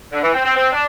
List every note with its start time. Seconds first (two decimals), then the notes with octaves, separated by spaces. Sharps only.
0.13 D3
0.23 E3
0.35 C4
0.45 C4
0.56 C4
0.72 D4